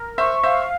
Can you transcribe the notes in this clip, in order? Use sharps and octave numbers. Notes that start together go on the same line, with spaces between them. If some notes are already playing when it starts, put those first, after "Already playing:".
Already playing: A#4
C5 E5 C#6
C5 E5 F5